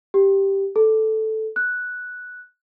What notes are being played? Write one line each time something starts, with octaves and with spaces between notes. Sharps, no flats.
G4
A4
F#6